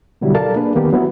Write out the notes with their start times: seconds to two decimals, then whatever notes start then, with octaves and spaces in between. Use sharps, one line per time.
0.21 B2 D3 F#3 G3 E4 G4
0.34 A4 A#4 D5 F5 A5
0.56 A#3 D4 G#4 B4
0.76 D#3 A#3 B3 G4
0.93 F#3 B3 E4 F#4